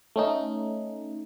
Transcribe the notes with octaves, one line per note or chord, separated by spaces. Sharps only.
A3 C#4 D#4